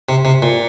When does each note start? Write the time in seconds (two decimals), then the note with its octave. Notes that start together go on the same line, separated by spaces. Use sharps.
0.09 C3
0.25 C3
0.42 A#2